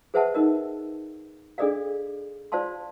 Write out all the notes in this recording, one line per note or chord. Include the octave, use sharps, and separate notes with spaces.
G#4 B4 C5 E5 F#5 A5
D#4 A#4 D#5
D4 G#4 A4 D5 D#5 F5
F4 C5 D5 F5 A5 C6